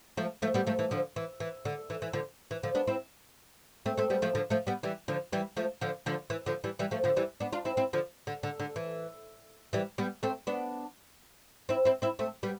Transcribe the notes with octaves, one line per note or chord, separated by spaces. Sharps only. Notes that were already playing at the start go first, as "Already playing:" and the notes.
F3 A3
F3 A3
G3 B3
F3 A3
E3
D3 F3
E3
E3
D3
E3
E3
D3 F3
E3
D3 F3
B3 D4
C4 E4
A3 C4
A3 C4
G3 B3
F3 A3
D3 F3
F3 A3
G3 B3
E3 G3
D3 F3
E3 G3
F3 A3
D3 F3
D3 F3
E3
D3 F3
E3 G3
E3 G3
F3 A3
D3 F3
E3 G3
B3 D4
D4 F4
C4 E4
C4 E4
D3 F3
D3
D3
D3
E3
E3 G3
G3 B3
A3 C4
B3 D4
C4 E4
C4 E4
C4 E4
A3 C4
G3 B3